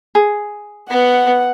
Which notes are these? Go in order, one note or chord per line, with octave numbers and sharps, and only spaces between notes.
G#4
B3 F#5